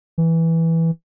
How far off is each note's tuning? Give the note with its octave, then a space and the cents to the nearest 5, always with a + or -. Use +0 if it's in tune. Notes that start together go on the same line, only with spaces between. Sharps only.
E3 -5